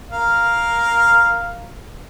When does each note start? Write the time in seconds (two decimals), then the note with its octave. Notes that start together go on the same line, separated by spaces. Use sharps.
0.12 A#4 F5